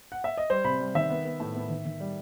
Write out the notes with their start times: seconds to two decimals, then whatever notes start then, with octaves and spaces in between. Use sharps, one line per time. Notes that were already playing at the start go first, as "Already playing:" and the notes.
0.12 F#5
0.24 E5
0.37 D#5
0.50 G3 C5
0.64 C3 B5
0.80 G3
0.95 D#3 E5
1.10 B3
1.25 B3
1.40 A2
1.55 B3
1.70 D#3
1.85 D#3
2.00 G3